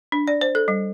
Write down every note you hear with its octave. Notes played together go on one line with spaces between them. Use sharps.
D4
D5
C5
A4
G3